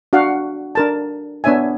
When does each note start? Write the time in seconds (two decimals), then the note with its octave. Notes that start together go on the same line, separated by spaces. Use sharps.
0.13 D4 F#4 F5 F#5
0.75 D4 A#4 A5
1.44 B3 D4 C#5 E5 G#5